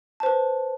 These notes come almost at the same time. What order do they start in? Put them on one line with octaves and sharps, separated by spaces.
A5 C5 B4